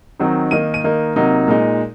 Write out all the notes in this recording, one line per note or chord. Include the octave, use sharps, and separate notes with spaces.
D#3 F#3 C4 D#4
D#3 A#3 D#4 D#7
D#7
D#3 A#3 D#4
C3 F#3 A#3 D#4
A#2 G#3 D#4